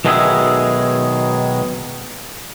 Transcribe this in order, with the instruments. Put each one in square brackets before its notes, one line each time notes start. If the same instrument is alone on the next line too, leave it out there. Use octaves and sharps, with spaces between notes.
[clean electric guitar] B1 B2 D#3 G#3 G#4 E5